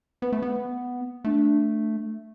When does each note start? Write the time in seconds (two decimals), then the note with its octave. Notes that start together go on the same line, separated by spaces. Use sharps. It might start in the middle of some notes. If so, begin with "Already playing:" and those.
0.22 B3 B4
0.32 A3
0.42 B3
1.24 A3 D4